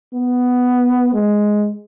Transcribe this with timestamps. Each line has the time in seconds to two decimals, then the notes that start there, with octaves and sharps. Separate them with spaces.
0.14 B3
1.14 G#3